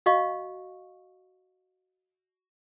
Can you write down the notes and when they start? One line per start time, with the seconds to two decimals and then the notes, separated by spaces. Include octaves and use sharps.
0.06 F#4 D#5 F5 C#6